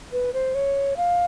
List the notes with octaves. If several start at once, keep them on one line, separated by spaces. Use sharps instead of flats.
B4
C5
C#5
F5